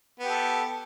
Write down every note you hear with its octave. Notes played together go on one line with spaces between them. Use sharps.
B3 G4 A4